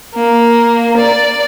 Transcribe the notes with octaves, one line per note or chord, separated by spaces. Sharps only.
A#3
D5